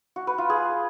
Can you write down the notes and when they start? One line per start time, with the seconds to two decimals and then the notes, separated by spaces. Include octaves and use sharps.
0.16 F#4
0.27 B4
0.38 F4
0.50 G#4